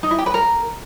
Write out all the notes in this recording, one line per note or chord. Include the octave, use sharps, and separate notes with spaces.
D#4
E4
G4
B4
A#4